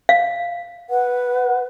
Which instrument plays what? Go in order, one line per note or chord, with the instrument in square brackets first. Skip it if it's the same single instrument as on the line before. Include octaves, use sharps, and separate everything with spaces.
[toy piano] F5
[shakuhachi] B4 [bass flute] F#5